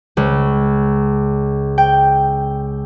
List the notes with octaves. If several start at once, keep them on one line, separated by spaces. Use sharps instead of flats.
C#2
G5